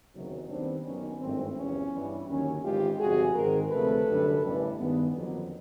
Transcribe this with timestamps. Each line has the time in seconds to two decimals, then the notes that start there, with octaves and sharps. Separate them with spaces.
0.13 F#1 E2 C3 D#3 F#3
0.49 D#2 D#3 G3 B3 C4 D4
0.85 F#1 F#2 D#3 F#3 B3 C#4
1.20 G#1 G2 E3 A3 C4
1.56 E2 C3 F3 C#4
1.93 G2 E3 G3
2.28 D#2 D3 F#3 C#4
2.63 G#1 G#2 E3 G#3 F4 G4
2.99 G1 F2 C3 F#4 G#4
3.35 G#2 D#3 G#3 C4 G#4 A#4
3.71 D2 C3 F3 A3 A4 B4
4.07 F#2 D3 G3
4.43 A1 G2 E3
4.78 G2 D#3 G#3 B3
5.15 F2 D3 F#3 A#3